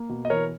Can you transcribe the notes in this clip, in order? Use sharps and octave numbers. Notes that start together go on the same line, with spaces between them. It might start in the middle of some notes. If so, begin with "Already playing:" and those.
Already playing: A#3
B2
D#5
E3 A#4 C#5